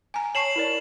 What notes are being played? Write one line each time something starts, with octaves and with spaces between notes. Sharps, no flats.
G#5 A#5
C#5 A5 C#6 C7 E7 F#7
E4 A#4 D5